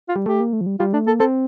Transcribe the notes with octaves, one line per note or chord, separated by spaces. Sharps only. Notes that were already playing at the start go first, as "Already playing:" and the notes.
F4
G3
A3 G4
A#3
A3
F3
G3
G3 F4
A3 D4
A#3 A4
C4 A4